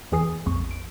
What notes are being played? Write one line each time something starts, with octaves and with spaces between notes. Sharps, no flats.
E2 E3 G#4 G#5 D#6 C7
A#1 F2 C#6
D7